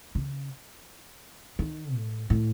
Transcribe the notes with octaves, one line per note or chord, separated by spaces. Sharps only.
C#3
D#3
A2
A2